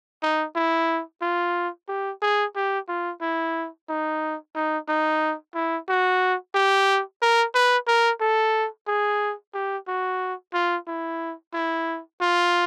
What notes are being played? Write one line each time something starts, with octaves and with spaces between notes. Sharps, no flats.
D#4
E4
F4
G4
G#4
G4
F4
E4
D#4
D#4
D#4
E4
F#4
G4
A#4
B4
A#4
A4
G#4
G4
F#4
F4
E4
E4
F4